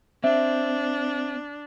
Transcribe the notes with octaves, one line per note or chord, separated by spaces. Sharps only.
C4 D4 E5